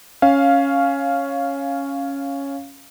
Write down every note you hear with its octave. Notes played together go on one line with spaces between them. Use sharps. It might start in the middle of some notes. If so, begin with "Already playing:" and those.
C#4 F5